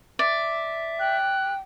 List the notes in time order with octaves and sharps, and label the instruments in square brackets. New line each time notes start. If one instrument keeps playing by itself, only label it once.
[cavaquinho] D5 [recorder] E5
[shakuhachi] G5 [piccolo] F#6